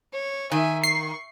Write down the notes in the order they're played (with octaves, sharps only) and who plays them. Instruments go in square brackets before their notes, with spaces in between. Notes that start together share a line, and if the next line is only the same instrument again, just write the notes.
[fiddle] C#5
[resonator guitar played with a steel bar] D#3 [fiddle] E5 G#5
[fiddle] C#6 [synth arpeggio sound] C7